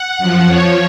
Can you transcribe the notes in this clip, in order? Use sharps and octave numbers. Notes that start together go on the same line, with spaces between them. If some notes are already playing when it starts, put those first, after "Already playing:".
Already playing: F#5
F#2 F3
F2 F3 C#5